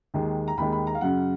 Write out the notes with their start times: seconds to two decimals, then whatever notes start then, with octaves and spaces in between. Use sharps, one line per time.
0.14 D#2 D#3 G#3
0.48 A#5
0.57 D#2 D#3 G#3 B5
0.72 B5
0.87 A#5
0.95 F5
1.01 F#2 C#3 F#3 F#5